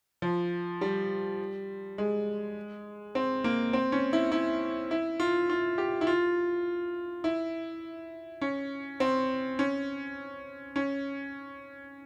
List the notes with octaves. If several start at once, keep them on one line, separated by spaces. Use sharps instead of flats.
F3
G3
G#3
C4
A#3
C4
C#4
E4
E4
E4
F4
F4
G4
E4
F4
E4
C#4
C4
C#4
C#4